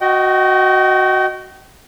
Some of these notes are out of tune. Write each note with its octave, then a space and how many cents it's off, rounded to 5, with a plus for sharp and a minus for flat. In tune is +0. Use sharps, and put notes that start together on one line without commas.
F#4 +0 D#5 +0 G5 -35